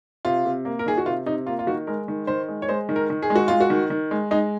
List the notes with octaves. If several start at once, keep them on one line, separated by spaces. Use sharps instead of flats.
C3 F4
C3
A#3
A#4
D#3 G#4
F#4
C3 F4
C3 D#4
A#3 F4
F4
D#3 F#4
G#3 A#4
D#3
D#3 C5
G#3
C#5
G#3 C5
D#3
A#4
D#3
G#4
G#3
F#4
G#3 F4
F#4
D#3
D#3
G#3
G#3 D#4